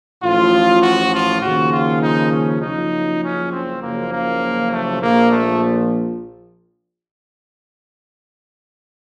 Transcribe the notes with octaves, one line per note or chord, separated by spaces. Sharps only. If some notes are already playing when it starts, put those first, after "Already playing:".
A1 A2 F3 F4
F#4
F4
D#2 C#3 F3 F#4
F4
D#4
C#4
F#1 F#2 C#3 F3 D#4
C#4
C4
F#1 F#2 C#3 F3 A#3
A#3
A3
A#1 A#2 F3 A#3
A3